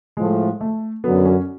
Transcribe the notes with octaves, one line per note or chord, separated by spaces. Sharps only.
A2 F3 G#3 A3
A3
F#2 D3 F#3 B3
C#4